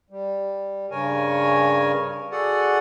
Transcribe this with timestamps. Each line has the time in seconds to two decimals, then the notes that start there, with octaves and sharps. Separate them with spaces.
0.10 G3
0.91 G2 C#3 A#4 C#5 G#5
2.32 F#4 G#4 A4 D5 F#5